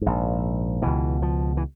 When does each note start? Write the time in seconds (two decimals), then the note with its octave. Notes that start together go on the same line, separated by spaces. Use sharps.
0.01 A#1 G#2
0.82 C#2 B2 E3
1.22 F3
1.57 E3